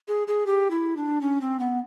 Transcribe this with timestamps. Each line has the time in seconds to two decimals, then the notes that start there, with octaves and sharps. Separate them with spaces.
0.08 G#4
0.28 G#4
0.46 G4
0.71 E4
0.97 D4
1.21 C#4
1.41 C4
1.59 B3